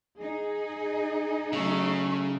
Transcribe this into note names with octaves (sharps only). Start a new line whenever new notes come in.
D#4 G#4
C#3 F#3 A3